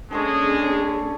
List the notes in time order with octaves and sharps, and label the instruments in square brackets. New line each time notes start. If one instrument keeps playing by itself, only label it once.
[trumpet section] G#3 [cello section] A#3 C#4 G#4 [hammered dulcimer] D4 A4 C#5